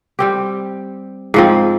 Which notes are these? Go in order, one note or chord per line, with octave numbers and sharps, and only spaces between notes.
G3 C4 G4
G#2 F3 C4